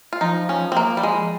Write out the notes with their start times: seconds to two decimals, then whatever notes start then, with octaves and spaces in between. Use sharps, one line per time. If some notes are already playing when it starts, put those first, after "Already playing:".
0.13 F4
0.21 F3 D#4
0.49 C#4
0.72 C4
0.77 A#3
0.97 G3
1.03 G#3